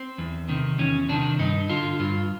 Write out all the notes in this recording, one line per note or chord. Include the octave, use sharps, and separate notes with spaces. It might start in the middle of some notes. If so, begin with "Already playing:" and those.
Already playing: C4
E2
C3 D#3
E2 C#4
C3 D#3 D4
G2 D#4
D3 F4
G2 F4